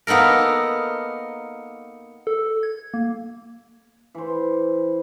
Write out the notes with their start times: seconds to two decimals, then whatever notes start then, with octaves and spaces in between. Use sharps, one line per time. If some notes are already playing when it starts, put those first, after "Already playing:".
0.07 A#3 B3 D#4 A4 A#4
2.27 A4
2.63 G#6
2.94 A#3
4.15 E3 C5